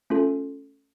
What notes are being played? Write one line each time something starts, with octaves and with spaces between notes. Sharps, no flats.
A3 C#4 F4 A4